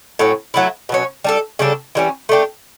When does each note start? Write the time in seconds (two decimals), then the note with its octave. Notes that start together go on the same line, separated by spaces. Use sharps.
0.19 A2 F#3 C#4
0.54 F#3 A3 E4
0.89 B2 F#3 C#4
1.24 G3 D4 A4
1.59 C#3 G3 D4 A4
1.95 E3 G3 C#4
2.29 A3 D4 G4